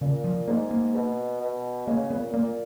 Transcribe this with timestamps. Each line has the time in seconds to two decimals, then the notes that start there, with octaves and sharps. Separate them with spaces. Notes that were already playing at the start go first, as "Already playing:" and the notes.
0.01 A#2 C#3
0.24 F3
0.48 G#2 A#3
0.71 A#3
0.94 B2
1.41 B2
1.87 C#3 A#3
2.10 A#2 B3
2.33 A#2 A#3